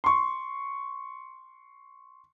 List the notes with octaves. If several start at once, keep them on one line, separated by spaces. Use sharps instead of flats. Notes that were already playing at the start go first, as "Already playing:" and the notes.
C6 C#6